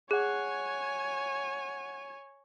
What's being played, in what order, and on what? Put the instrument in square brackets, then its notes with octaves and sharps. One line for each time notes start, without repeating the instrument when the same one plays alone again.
[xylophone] G#4 [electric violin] C#5 [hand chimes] F#5 F#6 [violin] G#5